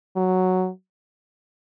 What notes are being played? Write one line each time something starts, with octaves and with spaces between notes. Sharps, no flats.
F#3